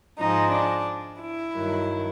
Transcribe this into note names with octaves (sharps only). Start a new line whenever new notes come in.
G#2 F3 G#3 D#4
D4
E4
G2 D#3 F#3